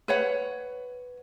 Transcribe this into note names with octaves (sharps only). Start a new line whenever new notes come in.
B4 C#5 F#5